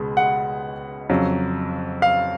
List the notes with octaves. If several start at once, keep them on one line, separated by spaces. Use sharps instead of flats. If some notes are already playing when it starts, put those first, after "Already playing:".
Already playing: C#2 B2 G#3
F#5
F2 C#3 F#3
F5